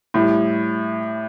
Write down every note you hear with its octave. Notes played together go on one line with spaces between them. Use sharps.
A2 G3